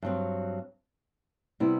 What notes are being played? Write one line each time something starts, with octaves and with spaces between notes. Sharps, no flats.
G2 F#3 C4
C3 G3 B3 E4